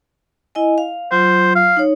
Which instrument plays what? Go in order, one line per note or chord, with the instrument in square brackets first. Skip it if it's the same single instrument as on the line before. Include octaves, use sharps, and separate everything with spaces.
[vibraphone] E4 D#5 G#5
F5
[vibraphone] F#3 F4 [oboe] C5
[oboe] F5
[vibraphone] D#4 C#5